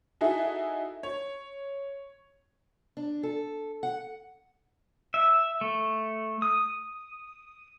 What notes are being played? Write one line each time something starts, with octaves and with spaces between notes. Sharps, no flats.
D#4 E4 F#4 G#4 A4 E5
C#5
D4
A4
F#5
E5
A3
D#6